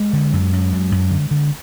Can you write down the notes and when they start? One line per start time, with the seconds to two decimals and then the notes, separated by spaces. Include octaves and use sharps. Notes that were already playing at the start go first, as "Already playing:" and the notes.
Already playing: G#3
0.13 D3
0.33 F#2
0.53 F#2
0.72 F#2
0.92 F#2
1.11 D3
1.31 D3